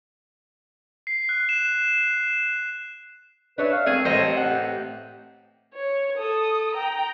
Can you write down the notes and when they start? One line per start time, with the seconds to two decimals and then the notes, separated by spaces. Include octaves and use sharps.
1.07 C7
1.29 F#6
1.49 E7
3.58 D4 B4 C#5 E5
3.73 F5
3.87 A3 C4 G#4
4.05 A1 C5 D#5
4.37 F#5
4.51 G4
5.74 C#5
6.18 A4 D#6
6.75 G5 A#5